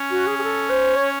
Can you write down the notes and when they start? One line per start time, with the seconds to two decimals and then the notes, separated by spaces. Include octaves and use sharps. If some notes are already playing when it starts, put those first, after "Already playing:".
Already playing: C#4
0.11 F#4
0.26 G#4
0.39 G#4
0.43 A4
0.70 C5
0.95 C#5